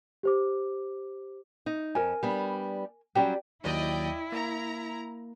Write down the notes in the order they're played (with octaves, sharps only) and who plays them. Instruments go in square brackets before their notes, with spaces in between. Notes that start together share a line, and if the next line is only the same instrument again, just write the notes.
[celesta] G4 C5 D6
[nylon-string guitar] D#4
[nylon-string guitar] F2 [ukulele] A#4 G#5
[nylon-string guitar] G3 B3 D4
[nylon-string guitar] F#3 G3 C#4 [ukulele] G4 D5
[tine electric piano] D#2 F#3 [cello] E4 [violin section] D5 D#5 G5
[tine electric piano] A#3 [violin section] A#5